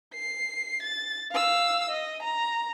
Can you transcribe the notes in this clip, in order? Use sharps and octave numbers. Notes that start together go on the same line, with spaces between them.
C7
A6
F5 E6
D#5
A#5